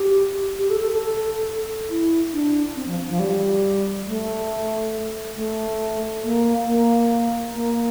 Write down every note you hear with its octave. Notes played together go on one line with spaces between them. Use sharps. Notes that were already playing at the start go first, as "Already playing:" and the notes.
Already playing: G4
G4
A4
A4
A4
E4
D4
C4
F3
F3
G3
A3
A3
A#3
A#3
A#3